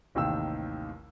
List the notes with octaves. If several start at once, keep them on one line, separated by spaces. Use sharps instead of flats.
A1 D#2 C3 D#3 G5 E6